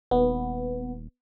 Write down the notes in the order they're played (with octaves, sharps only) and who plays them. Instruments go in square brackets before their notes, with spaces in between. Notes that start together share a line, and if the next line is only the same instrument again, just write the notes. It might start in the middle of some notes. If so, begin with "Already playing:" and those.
[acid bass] D#1 [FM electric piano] B3